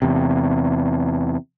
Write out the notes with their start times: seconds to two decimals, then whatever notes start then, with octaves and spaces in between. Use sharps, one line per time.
0.02 E2 C3